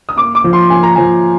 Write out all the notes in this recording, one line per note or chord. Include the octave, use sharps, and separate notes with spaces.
D#6
A#3 D6
D6
F3
C6
A#3 G#5
A#5
F3 G#5